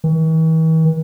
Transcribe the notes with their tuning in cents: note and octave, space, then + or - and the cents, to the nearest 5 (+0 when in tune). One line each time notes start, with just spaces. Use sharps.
E3 -45